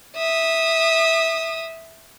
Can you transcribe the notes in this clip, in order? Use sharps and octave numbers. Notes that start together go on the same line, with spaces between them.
E5 D#6